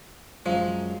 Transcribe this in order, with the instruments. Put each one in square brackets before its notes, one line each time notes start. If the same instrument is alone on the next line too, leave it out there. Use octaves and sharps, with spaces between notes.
[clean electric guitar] F#2 F#3 G#3 [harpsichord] F3